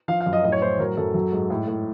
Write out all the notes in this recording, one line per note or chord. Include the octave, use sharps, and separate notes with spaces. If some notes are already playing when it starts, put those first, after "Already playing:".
F3 F5
F5
F#2
D#5
A2 D#5
C#5
A2 C5
F#3 A#4
F#2 A4
F#3
G#2
A2
A2